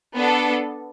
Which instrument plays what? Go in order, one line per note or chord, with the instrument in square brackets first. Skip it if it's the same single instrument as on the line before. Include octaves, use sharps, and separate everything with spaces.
[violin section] B3 D4 A4